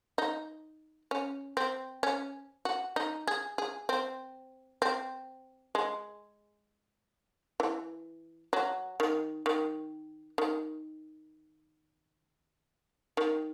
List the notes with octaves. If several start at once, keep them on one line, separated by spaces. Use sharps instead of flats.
D#4
C#4
C4
C#4
F#4
D#4
G#4
G#4
C4
C4
G#3
E3
F#3
D#3
D#3
D#3
D#3